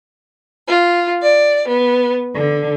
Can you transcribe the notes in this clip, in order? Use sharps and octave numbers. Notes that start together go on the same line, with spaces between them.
F4
D5
B3
D3